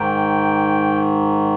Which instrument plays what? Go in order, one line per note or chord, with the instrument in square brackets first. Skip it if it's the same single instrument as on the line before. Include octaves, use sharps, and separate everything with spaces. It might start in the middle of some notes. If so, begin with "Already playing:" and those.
Already playing: [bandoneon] G#2 D#3 G5